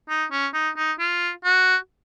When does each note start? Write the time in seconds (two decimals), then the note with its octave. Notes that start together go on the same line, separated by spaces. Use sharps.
0.09 D#4
0.32 C#4
0.54 D#4
0.77 D#4
0.99 F4
1.45 F#4